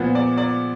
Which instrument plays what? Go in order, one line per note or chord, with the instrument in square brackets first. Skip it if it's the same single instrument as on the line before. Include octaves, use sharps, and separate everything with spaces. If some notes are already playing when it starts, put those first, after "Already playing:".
Already playing: [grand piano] A#2 F3 B3
D5
D5